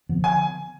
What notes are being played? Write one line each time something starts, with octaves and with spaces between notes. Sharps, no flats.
D3 F3 B3
G#5